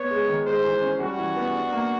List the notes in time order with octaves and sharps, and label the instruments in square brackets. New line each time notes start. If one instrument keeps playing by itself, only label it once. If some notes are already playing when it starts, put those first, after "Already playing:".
Already playing: [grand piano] B3 [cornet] C#5
[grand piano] G#3
D#3
[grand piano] G#3 [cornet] C5
[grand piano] E3
C#4
[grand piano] G3 [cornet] F#4
[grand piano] E3
B3
D4
A#3